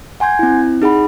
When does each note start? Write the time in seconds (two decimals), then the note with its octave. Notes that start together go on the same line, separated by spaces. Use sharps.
0.20 F#5 G#5 C6 G6 G#6
0.39 C4 E4
0.82 D#4 G#4 F#5 B5